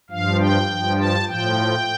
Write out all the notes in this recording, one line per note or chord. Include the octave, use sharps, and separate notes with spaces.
G2 F3 F5
G5
G2 F3
A5
A2 F3 G5